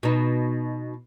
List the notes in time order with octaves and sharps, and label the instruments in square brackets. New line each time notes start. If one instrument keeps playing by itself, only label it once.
[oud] B2 D#4